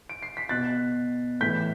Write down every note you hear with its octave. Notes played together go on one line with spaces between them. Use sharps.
D7
C7
B6
B2 F#6 A6
A2 E3 G6 B6